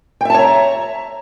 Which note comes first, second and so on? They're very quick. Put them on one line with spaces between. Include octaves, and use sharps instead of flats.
G5 E5 A5 C#5 A#5